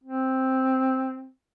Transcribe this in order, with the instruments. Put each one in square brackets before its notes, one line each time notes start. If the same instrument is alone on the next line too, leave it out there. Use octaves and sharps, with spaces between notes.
[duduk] C4